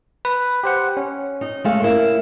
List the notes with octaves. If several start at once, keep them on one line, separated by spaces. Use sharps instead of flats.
B4
G4 C5 F#5
C#4
D#4
G#3 A3 F5
A#3 E4